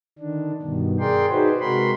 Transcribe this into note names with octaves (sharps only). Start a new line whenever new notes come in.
D3 D#3 D4
G2 B2 D#3
G#4 A#4 D5 G5 C6
D#4 F#4 G#4 B4 C5
C3 G#3 F#4 A#4 B5 C6